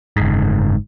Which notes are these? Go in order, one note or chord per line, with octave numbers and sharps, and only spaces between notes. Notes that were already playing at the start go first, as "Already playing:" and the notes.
F#1 G#2